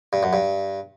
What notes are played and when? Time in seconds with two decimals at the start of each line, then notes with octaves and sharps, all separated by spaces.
0.13 G2
0.23 F#2
0.33 G2